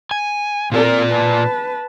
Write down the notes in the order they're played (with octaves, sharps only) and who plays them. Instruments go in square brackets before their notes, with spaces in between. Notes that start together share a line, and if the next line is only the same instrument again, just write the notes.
[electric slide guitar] G#5
[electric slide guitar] A#2 F4 D5 [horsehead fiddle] C4 A#4
[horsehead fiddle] B4 A5